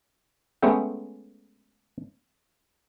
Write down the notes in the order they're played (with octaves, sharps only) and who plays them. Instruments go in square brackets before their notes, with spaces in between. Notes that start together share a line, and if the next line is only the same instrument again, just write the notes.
[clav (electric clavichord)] G#3 A3 B3 C#4 E5 G5